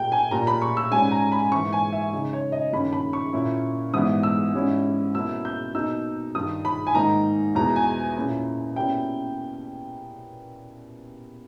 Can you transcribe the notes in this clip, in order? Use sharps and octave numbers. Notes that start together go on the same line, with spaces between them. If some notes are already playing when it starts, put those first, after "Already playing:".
Already playing: A#2 G3 A#3 G5
G#5
A#2 G3 A#3 A#5
B5
C#6
E6
G#2 G3 C#4 G#5
A#5
B5
G#2 E3 A#3 C#6
G#5
E5
C#3 G#3 D#4
C#5
D#5
G2 D#3 A#3 C#4 B5
B5
C#6
A#2 A#3 C#4 E4
G#2 E3 G3 B3 D#6
E6
G#2 G3 C#4 E4
B2 A#3 C#4 E4 E6
G6
B2 A#3 D#4 E6
G2 D#3 G3 D#6
B5
G#5
G#2 D#3 A#3 D#4 A#5
E2 B2 G#3 A#5
G#5
A#2 A#3 C#4 E4
B2 G3 A#3 C#4 E4 G5